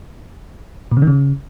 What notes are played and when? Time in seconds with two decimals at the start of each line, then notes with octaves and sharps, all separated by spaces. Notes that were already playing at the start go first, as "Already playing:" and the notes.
0.92 A#2
0.97 C#3
1.02 D#3
1.07 C#3